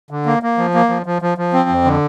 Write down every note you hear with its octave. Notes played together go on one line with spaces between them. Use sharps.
D3
A#3
A#3
F3
A#3
F3
F3
F3
F3
C4
F2
D3